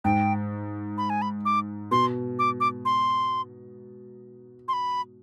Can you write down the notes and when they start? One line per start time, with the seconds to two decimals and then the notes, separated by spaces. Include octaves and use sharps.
0.04 G#2 G5
0.98 B5
1.10 G#5
1.22 B5
1.45 D6
1.91 B2 C6
2.39 D6
2.60 D6
2.85 C6
4.68 C6
4.73 B5